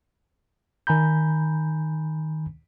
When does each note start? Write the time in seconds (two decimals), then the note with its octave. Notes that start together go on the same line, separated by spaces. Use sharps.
0.87 D#3 G#5 A#5 B5 G6